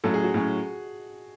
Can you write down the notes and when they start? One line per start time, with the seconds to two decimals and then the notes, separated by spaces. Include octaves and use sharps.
0.04 A2 F#3 C#4 A4
0.14 G#4
0.24 F#4
0.34 A2 F#3 C#4